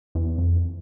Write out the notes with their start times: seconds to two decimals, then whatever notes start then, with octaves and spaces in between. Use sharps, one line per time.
0.15 E2
0.38 F2